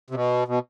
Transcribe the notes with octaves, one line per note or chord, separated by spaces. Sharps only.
C3
B2
B2